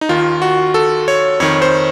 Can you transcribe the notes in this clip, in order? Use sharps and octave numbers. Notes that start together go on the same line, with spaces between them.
D#4
D#2 D#3 F4
F#4
A4
C#5
F2 D#3 C#5
C5